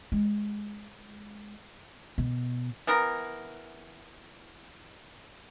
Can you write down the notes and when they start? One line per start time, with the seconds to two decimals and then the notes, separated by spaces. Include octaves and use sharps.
0.12 G#3
2.18 B2
2.87 E3 B3 A#4